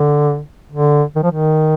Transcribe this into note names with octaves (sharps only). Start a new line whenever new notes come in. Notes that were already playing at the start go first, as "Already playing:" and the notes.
Already playing: D3
D3
D#3
F3
D#3